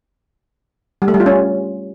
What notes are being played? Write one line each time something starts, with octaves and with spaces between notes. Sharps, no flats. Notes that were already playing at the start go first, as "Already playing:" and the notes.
G3
A3
G3
F4
C#4